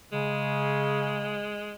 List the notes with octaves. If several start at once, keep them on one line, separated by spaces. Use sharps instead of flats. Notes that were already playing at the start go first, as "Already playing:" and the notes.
C#3 G#3